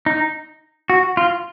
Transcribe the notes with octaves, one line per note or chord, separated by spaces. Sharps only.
D#4
F#4
F4